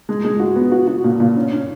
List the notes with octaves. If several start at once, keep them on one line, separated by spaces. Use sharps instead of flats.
G#3
G#3
F#4
B3
F#4
F#4
A#2
A#2
C#4
C#4